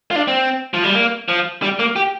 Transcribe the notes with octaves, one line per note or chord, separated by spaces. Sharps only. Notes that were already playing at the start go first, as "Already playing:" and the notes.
F4
D4
C4
F3
G3
A#3
F3
G3
A#3
G4